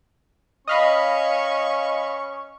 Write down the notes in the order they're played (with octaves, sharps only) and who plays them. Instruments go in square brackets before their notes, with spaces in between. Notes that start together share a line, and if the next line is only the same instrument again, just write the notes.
[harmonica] C#4 C#6 [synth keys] D#5 F5 B5